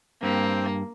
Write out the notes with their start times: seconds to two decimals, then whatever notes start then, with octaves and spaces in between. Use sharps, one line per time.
0.23 G2 A#3 C4